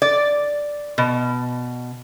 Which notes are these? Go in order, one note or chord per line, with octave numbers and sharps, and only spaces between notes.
D5
B2